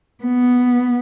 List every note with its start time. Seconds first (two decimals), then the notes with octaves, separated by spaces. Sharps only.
0.24 B3